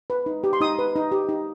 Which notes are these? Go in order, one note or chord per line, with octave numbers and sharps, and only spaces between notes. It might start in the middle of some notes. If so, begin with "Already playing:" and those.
B4
D#4
G4
C6
D#4 D#6
B4
D#4
G4
D#4